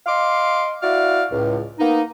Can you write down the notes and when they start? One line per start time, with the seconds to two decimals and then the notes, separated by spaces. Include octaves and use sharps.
0.07 D#5 F5 C6 D6
0.82 E4 F#4 D5 F5
1.31 C#2 A2
1.79 A#3 B3 D#4